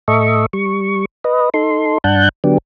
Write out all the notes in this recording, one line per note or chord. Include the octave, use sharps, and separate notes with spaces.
A2 A4 D#5 E5 C#6
G3 C#6
B4 D#5
D#4 A4 C6
G2 D4 F#5 A5 F#6 G6
D3 F#3 B3 D4 G4